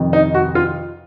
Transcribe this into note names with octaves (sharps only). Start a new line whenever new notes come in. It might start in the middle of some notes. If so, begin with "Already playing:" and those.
Already playing: F2 C3 D#3
D#4
F#4
F4